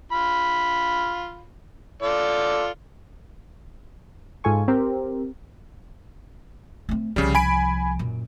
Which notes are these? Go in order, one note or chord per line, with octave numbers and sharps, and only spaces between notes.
F4 B5
F4 A4 D5
G#2 F4 A4 G#5 C#6
C4 G4 A#4
A3 C4
C2 C#3 F3 G3
G#5 B5 D7
F#2 A#2